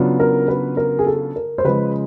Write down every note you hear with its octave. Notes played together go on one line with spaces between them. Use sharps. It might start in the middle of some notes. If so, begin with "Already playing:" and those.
Already playing: C#3 F#3 B3 D4 F4
A#4
B4
A#4
G#4
A4
A#4
C5
C#3 F3 G#3 B4